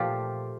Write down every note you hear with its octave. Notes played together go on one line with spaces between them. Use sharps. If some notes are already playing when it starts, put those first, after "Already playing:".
Already playing: A#2 F3 A3 F4 G4